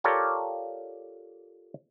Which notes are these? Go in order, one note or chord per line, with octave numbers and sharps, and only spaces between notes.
F4 G4 A4 A#4 C#5 D5